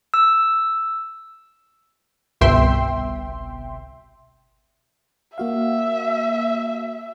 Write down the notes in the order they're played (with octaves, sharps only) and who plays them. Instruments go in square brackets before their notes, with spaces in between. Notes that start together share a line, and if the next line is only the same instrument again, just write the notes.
[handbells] E6
[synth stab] G1 C2 B2 E5 G5 C6
[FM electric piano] A#3 F#4 F5 [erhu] E5